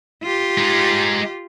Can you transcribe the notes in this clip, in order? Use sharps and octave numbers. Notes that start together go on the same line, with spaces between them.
F4 G4
G#3 D#4